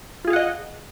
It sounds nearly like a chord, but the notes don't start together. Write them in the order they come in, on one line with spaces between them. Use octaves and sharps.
F4 G#4 F5 F#5 D#5